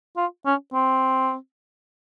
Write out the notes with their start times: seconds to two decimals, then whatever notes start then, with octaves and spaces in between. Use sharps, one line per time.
0.17 F4
0.46 C#4
0.74 C4